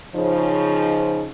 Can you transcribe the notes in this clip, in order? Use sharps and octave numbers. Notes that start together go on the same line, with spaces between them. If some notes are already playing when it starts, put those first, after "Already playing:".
C#3 F3 D#4